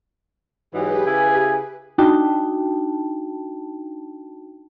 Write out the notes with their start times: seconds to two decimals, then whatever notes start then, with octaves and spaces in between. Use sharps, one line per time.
0.75 G#2 E3 F#3 G4 G#4 B4
1.06 C#3 E4 G#5
1.98 D4 D#4 F#4 G5 A5